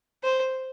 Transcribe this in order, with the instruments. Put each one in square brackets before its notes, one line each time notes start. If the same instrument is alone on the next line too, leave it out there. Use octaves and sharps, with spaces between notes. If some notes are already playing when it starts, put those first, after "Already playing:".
[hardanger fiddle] C5